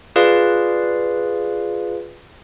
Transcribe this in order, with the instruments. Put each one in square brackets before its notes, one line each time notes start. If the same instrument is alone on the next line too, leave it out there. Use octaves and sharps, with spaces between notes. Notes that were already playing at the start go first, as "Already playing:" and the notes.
[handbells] F4 G#4 B4 D5 F5